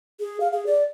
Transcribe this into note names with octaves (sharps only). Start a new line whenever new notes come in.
G#4
F5
G#4
D5